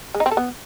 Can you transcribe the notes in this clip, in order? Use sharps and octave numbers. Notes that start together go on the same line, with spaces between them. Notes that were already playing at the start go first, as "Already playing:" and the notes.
G#3
D#4
C4
A4
B3